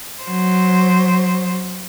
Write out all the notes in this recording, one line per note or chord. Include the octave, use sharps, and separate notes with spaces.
F#3 C5